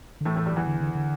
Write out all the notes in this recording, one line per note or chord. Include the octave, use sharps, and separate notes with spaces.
D3
A2 E3 A3
A2 A3
G2 G3
E2 E3
D3
D3
D3